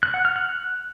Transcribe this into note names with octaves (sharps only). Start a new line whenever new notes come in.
F#6
F#5
F6
F#6